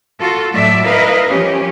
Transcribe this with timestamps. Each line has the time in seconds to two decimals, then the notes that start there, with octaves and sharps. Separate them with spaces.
0.19 F4 F#4 A4
0.52 A2 F#3 A3 D5 E5
0.84 E4 A#4 B4 D#5 F5
1.28 F3 C#4 G4